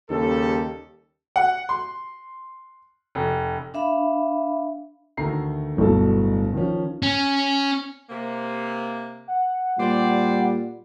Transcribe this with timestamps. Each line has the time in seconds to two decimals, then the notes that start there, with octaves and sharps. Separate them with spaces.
0.10 D#2 C#3 G3 A4
1.36 F#5
1.69 C6
3.15 F1
3.74 D4 E5 F5 B5
5.17 D2 D#3 A3 A#5 C7
5.77 D1 G1 B2 A4
6.53 D#3 F3 C#4
7.02 C#4
8.09 C3 A#3
9.28 F#5
9.79 A#2 G3 C5 D5